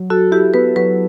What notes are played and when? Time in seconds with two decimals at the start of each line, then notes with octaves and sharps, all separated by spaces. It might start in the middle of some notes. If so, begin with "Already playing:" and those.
Already playing: F#3
0.10 F#4 A4
0.32 E4 G4
0.54 B3 B4
0.76 F#3 B4